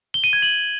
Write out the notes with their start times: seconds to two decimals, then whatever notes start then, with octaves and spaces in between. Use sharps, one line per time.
0.14 G7
0.24 D#7
0.33 G#6
0.42 F#7